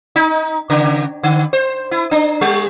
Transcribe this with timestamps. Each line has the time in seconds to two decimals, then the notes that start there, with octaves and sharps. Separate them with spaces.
0.16 D#4
0.70 C#3
1.23 D3
1.53 C5
1.91 E4
2.11 D4
2.41 G3